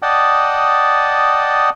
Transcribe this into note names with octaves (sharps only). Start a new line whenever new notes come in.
D5 D#5 F#5 G5 A5 D#6